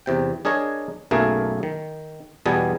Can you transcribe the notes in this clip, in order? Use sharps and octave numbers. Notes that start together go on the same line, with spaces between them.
E2 C3 G5
D4 G#4 A#4 C#5 D#5
B1 F#2 A3 A#3 G#4
D#3
E2 B2 G3 B3 G#4 A5